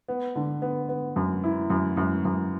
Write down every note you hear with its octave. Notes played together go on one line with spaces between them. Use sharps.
B3
D3
B3
B3
F#2
E4
F#2
F#2
F#2